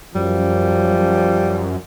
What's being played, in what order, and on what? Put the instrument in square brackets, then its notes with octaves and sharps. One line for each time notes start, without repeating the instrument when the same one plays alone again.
[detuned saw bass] F#2 [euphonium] F3 [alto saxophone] G3